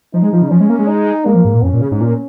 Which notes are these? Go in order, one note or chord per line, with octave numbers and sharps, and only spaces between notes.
F3 D#4
G#3
F3
C#3
F3 C#4
G#3
A#3
G#3
D#4
G#3 A#3
F3
G#2
A#2
F2 C#4
A#2
C#3
G#2
A#2